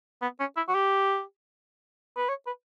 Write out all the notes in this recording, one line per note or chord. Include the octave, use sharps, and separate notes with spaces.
B3
C#4
E4
F#4
G4
B4
C#5
B4